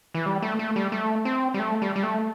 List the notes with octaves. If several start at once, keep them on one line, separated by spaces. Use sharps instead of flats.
E3
G3
A3
A3
G3
A3
C4
G3
A3
G3
G3
A3